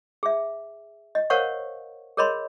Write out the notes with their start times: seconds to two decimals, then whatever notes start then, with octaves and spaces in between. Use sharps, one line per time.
0.23 G#4 E5
1.15 D#5
1.30 A#4 C5 C#5 F5 F#5 C#6
2.17 G#4 A#4 C#5 D#5 B5 C6